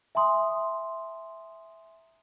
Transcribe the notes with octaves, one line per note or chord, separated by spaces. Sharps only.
E5 G#5 A#5 C6 D#6